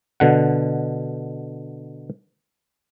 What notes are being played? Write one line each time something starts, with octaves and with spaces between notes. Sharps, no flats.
B2 D3 F#5